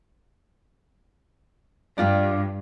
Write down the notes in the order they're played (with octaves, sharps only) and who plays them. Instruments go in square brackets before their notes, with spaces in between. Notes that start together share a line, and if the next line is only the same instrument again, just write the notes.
[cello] G2 [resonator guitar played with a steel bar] D4 F4 G4